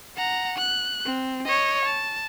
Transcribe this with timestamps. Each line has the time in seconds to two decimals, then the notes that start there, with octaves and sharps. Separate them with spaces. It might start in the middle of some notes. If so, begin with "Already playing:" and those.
0.16 F#5 A#5
0.58 F#6
1.05 C4
1.46 C#5 D#5
1.85 A5